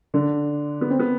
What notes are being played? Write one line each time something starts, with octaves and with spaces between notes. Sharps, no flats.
D3 D4
B3
C4
B3